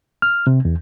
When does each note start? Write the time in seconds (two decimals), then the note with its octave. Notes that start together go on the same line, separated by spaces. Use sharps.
0.22 F6
0.47 C3
0.65 E2